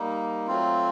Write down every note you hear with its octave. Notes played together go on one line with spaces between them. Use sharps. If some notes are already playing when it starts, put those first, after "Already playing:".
Already playing: G3 A#3 D#4
F#3 A3 C4 F4